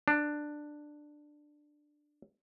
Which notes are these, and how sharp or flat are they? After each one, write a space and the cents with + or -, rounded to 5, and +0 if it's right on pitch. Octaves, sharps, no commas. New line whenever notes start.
D4 +10